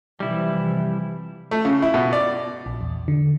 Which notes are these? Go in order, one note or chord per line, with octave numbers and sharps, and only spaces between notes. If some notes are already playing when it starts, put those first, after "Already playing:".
C3 E3 F3 G3 E4
A3
C#3
E4
B2
D5
A#1
E2
D3